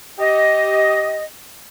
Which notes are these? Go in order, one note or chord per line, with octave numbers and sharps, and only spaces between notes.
G4 D#5